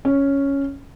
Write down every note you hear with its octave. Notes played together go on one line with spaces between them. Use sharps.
C#4